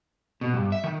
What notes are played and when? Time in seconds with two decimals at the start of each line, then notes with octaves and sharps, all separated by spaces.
0.41 B2
0.54 G2
0.72 E5
0.84 D#3